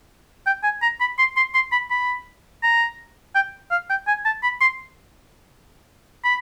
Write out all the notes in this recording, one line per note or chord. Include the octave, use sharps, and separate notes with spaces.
G5
G#5
A#5
B5
C6
C6
C6
B5
B5
A#5
G5
F5
G5
G#5
A5
B5
C6
B5